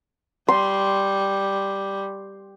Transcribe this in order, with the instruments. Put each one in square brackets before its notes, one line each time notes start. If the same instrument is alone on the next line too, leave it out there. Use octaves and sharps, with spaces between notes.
[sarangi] G3 [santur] C6